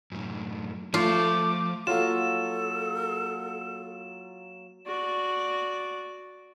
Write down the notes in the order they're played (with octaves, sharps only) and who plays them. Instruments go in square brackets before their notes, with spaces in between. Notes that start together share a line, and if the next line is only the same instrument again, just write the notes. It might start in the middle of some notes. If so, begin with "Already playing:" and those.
[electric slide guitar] F#2 A2
[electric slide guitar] F3 [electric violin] A3 [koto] F4 [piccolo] D6
[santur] F#3 A#3 A#4 [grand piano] F4 [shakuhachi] A4 [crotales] E7
[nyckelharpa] F#4 D5